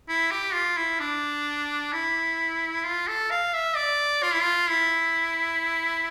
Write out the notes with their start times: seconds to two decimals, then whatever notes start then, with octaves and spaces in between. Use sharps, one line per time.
0.08 E4
0.31 G4
0.54 F4
0.77 E4
1.00 D4
1.93 E4
2.84 F4
3.08 A4
3.31 F5
3.53 E5
3.76 D5
4.23 F4
4.33 E4
4.42 F4
4.69 E4